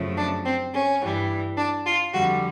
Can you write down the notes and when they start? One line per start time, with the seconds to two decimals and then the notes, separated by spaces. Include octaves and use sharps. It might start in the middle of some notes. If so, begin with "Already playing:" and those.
Already playing: F#2 C#3 F3 A3
0.17 D4
0.45 C4
0.73 C#4
1.01 G2 E3 G3
1.57 D4
1.85 F4
2.13 F2 D3 G3 F#4